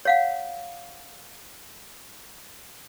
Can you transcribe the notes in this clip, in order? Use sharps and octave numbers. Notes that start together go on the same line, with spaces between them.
C#5 F5 F#5